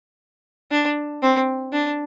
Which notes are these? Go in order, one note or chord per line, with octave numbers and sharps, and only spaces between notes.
D4
C4
D4